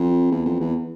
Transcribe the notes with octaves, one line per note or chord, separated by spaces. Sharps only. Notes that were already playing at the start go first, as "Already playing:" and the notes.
Already playing: F2
E2
F2
E2